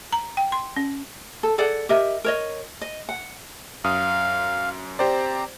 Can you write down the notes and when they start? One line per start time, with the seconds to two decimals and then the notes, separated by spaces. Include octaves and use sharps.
0.13 A#5
0.37 G5
0.52 C6
0.76 C#4
1.43 A4
1.58 G#4 A4 D5 F#5
1.89 G4 A#4 D#5 E5
2.24 A#4 C#5 D#5
2.81 D#5
3.09 F#5
3.84 F#2 F5 D#6
4.99 C4 G4 C5 D5 A#5